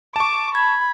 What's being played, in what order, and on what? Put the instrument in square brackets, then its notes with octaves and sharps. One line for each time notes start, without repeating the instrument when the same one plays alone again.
[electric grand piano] A5 C#6 [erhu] D6
[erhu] B5 [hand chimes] G#6